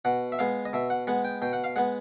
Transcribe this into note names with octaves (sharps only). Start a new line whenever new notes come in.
B2 F#5
E5
G#3 B3 F5
D#5
B2 E5
F#5
G#3 B3 F#5
G5
B2 G5
F#5
F5
G#3 B3 F#5